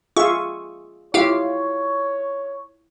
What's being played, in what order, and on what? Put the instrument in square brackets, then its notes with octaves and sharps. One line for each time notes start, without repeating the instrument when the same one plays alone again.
[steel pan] F4 G#4 E5 [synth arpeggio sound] C#6
[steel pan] E4 F4 [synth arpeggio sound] G4 F5 [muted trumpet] C#5